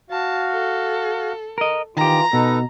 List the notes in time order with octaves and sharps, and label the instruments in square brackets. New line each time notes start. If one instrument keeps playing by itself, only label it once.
[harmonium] F#4 F5 [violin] A5
[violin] A4
[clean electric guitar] A#4 D#5
[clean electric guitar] D#3 G4 [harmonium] E3 F4 [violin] A#5
[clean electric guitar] B2 [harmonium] D#4 A4 B4